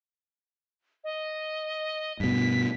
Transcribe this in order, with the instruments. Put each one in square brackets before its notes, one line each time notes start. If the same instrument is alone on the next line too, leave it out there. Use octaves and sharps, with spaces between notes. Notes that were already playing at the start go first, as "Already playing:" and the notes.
[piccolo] D#5
[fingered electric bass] G2 B2 [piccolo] B6